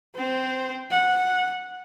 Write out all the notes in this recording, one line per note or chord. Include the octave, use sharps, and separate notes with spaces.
C4 C5
F#5